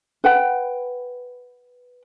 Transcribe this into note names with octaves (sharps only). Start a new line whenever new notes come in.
B4 F#5 G5